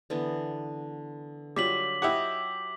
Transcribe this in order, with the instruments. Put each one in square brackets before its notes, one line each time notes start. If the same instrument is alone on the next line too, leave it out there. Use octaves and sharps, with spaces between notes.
[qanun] D3 E3 B3
[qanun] F#3 F4 E5 [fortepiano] G3 [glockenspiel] D6 B6 F#7
[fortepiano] E4 G4 F#5 [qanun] D#5 E5 [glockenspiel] D6